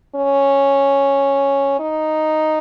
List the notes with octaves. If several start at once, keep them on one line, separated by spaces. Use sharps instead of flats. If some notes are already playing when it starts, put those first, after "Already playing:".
C#4
D#4